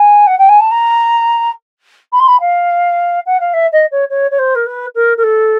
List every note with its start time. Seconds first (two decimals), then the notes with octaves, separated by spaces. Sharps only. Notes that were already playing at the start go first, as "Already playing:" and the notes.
Already playing: G#5
0.27 F#5
0.39 G5
0.49 G#5
0.60 A5
0.71 A#5
2.12 B5
2.20 C6
2.27 B5
2.40 F5
3.26 F#5
3.40 F5
3.54 E5
3.73 D#5
3.91 C#5
4.10 C#5
4.31 C#5
4.39 C5
4.55 A#4
4.66 B4
4.95 A#4
5.17 A#4
5.24 A4